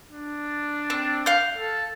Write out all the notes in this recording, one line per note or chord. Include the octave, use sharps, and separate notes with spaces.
D4
C4
F5 G6
A4